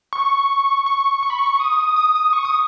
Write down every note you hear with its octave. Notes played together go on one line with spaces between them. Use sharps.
C#6
C#6
C#6
B5
C#6
D#6
D#6
D#6
C#6
D#6